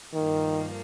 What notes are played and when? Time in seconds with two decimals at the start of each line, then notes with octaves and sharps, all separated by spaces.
0.14 G2 D#3 F3 A#3